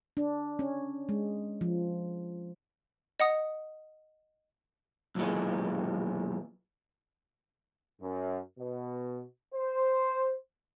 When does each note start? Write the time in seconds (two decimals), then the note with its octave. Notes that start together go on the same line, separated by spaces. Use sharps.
0.17 D4
0.59 C#4
1.09 G#3
1.61 F3
3.20 D#5 F#5 D#6
5.15 B1 F#2 A#2 E3 G#3
8.01 F#2
8.59 B2
9.54 C5